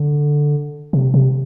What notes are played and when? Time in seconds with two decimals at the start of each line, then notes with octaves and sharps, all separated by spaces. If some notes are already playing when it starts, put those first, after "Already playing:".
Already playing: D3
0.93 C3
1.14 C3